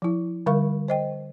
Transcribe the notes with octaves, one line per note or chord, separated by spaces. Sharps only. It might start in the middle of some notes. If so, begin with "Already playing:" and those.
F3 E4
D3 G3 A#4 F5 C#6
C5 D#5 G5